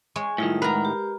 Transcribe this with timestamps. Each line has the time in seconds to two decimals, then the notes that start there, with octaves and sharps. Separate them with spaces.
0.16 G#3 G#4 C#5
0.38 A2 D#3 G3 E4 F4
0.62 G#3 A#4 B4 F#5 A#5 B5
0.85 G4